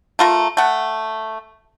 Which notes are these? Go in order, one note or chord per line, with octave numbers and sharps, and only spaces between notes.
A3 F4 A#4
A3 F#5